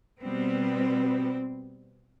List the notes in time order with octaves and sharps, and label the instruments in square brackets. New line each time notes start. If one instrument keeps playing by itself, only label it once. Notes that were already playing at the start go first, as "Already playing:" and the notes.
[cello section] B2 G3 B3 C4